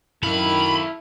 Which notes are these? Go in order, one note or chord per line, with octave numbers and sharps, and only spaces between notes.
F#2 D#3 E4 A4 F5 B5